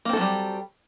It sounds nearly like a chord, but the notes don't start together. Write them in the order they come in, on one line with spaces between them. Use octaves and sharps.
A#3 C4 A4 F#3 G3